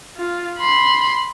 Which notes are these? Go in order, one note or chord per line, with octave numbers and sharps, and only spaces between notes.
F4
B5 C6